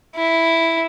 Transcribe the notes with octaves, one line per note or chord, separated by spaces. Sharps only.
E4